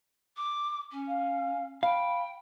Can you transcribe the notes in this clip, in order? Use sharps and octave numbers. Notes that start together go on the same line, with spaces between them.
D6
C#4
F5
F5 G5 B5